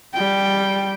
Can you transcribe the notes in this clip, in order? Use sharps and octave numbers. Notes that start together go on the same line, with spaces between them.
G3 G5